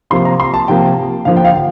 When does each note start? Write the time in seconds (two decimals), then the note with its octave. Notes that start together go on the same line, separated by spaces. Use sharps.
0.10 C3 F3 A#3 C6
0.25 A#5
0.40 C6
0.54 A5
0.68 C3 F3 A#3 G5
1.25 D3 F3 A#3 F5
1.37 G5
1.45 F5